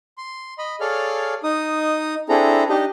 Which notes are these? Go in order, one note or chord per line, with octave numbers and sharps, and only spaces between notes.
C6
D#5 B5
G#4 A4 C#5 D5 F5 F6
D#4 D#6
C4 D4 E4 G#4 A4 A#5
D4 D#4 G4 D#5